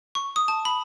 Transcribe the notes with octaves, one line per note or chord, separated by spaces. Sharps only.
C#6
D#6
A5
B5